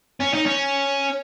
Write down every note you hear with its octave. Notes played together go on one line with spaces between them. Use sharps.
C#4
D#4
C#4